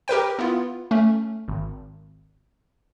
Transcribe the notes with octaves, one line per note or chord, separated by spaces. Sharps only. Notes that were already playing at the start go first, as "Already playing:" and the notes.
G4 A#4 B4 G5
B3 E4 F4
A3 C#4
G#1